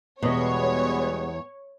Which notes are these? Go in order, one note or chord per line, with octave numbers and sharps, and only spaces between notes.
E2 B2 G3 G#3 B3 C#5 D#5